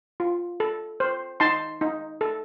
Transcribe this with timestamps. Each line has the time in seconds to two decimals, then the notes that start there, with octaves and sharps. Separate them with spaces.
0.20 F4
0.60 A4
1.00 C5
1.40 D#4 A5 C6
1.81 D#4
2.21 A4